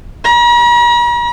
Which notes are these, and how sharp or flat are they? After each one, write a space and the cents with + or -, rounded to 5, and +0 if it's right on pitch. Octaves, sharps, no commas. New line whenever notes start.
A#5 +45